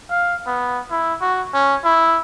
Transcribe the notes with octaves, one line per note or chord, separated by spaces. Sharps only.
F5
B3
E4
F#4
C#4
E4